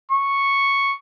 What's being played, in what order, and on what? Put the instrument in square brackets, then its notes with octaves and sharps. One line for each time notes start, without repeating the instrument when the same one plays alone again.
[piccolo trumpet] C#6